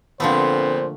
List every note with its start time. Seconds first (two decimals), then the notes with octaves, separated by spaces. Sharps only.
0.20 A#2 D3 F3 A3 B3 C4 C5